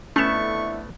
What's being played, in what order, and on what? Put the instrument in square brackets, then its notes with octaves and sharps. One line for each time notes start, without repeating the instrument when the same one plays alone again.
[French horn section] F2 D3 E4 [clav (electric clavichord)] A3 B3 [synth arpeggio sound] C#4 E7 [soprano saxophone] C#6